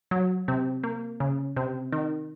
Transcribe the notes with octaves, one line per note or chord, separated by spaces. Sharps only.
F#3
C3
A#3
C#3
C3
D#3